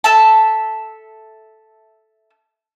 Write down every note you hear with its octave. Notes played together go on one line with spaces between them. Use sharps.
A4 E5 A5